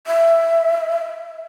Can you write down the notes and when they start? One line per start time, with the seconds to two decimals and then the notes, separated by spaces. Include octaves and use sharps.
0.07 E5